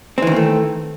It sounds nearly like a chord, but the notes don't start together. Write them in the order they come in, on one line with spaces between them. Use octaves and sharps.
C4 E3 D#3 A#3 A3